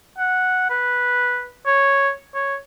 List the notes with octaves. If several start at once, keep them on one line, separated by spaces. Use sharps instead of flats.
F#5
B4
C#5
C#5